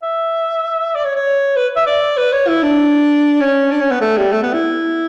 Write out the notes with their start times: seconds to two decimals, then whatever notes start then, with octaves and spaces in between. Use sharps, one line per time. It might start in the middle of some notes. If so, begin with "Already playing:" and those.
0.03 E5
0.95 D5
1.04 C#5
1.15 C#5
1.56 B4
1.76 E5
1.86 D5
2.17 B4
2.32 C#5
2.48 E4
2.63 D4
3.40 C#4
3.71 D4
3.80 C#4
3.91 B3
4.01 A3
4.17 G3
4.32 A3
4.42 B3
4.53 E4